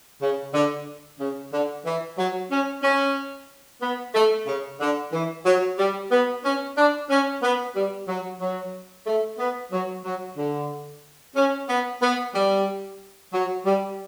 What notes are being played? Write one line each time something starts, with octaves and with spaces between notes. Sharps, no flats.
C#3
D3
C#3
D3
E3
F#3
C#4
C#4
B3
A3
C#3
D3
E3
F#3
G3
B3
C#4
D4
C#4
B3
G3
F#3
F#3
A3
B3
F#3
F#3
D3
C#4
B3
B3
G3
F#3
G3